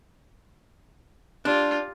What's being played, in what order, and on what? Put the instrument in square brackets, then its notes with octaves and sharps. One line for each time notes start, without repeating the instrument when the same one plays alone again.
[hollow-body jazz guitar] D4 [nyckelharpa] F4 G4